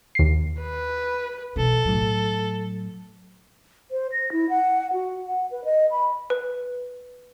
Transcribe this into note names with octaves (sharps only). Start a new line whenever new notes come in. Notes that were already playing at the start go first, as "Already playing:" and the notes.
D#2 C7
B4
B2 E3 A4
A2 F#3
C5
A#6
E4
F#5
F#4
F#5
B4
D#5
B5
B4